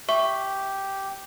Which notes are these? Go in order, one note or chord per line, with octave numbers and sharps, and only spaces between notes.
G4 E5 C#6